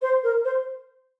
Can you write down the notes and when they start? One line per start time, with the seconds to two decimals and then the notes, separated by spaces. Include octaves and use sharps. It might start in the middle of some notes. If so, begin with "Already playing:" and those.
0.01 C5
0.23 A#4
0.44 C5